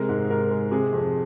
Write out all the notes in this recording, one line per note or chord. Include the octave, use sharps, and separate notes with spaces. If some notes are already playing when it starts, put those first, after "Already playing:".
Already playing: C3 G#3 A#4
G#2
G#2 A#4
G#3
C3 G#4
F2